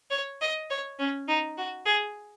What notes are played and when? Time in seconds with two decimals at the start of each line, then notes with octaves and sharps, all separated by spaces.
0.11 C#5
0.41 D#5
0.70 C#5
0.99 C#4
1.28 D#4
1.58 F#4
1.86 G#4